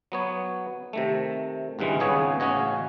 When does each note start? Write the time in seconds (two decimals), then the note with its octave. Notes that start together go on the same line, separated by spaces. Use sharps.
0.12 F#3 B3 C#5
0.93 C3 D#3 A3
1.79 G#1 C#2 G2 E3 G#3
2.00 G#1 C#2 C#3 B3 G#4 C#5
2.40 A1 C#3 C#4 F#4 C#5 D#5